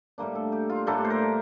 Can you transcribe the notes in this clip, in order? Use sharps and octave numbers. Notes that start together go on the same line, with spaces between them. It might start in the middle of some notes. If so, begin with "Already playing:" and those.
A2 G3 A#3 D4
A4
G4
F4
A2 G3 A#3 D4 A4
C5
A#4